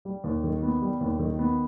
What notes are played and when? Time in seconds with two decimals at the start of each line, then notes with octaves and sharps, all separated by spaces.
0.05 G3
0.24 D#2
0.44 D#3
0.62 B3
0.82 G3
1.01 D#2
1.19 D#3
1.39 B3